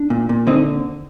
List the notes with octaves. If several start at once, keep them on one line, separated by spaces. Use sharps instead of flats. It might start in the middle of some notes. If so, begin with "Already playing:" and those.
Already playing: D4
A#2
A#2
D3 C4 D#4